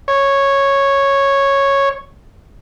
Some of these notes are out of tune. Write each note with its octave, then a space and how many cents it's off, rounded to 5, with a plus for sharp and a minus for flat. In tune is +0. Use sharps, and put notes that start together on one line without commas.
C#5 -5